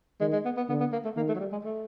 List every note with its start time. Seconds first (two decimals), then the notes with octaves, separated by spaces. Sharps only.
0.21 D#3 G#3
0.33 G#3
0.45 B3
0.57 B3
0.69 D3 B3
0.80 B3
0.93 A#3
1.05 A3
1.16 D#3 A#3
1.29 A3
1.35 F#3
1.40 G3
1.52 G#3
1.64 A3